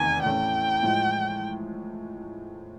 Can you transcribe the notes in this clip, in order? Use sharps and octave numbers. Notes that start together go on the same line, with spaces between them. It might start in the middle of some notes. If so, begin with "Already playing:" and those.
Already playing: F1 E2 D#3 G#5
A2 E3 A3 C#4 G5
A2 F3 G#3